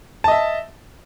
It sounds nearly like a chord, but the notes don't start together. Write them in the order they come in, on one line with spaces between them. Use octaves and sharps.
A5 D#5 E5